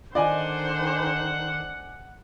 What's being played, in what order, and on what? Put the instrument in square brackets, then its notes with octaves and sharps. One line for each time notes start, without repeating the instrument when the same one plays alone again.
[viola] D3 C5 [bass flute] D#3 [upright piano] D5 D#5 G#5 [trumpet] F#5